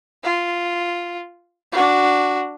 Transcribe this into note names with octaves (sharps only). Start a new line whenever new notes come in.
F4
D4 F#4